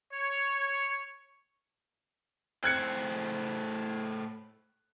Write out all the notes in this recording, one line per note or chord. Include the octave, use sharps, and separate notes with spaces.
C#5
A2 C5 G5 F#6 G#6 C#7